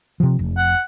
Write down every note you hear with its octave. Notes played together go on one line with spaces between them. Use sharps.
C3 F3
F1
F#5